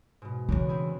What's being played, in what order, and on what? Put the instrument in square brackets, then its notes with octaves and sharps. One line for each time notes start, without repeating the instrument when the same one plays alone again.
[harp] G#2 B2
[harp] E2 F#3 D4 [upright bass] C#3 E3
[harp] C4 E4 G#4